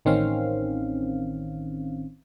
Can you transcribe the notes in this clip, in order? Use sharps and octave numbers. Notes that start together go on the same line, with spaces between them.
A1 D#3 C4 C#4 F5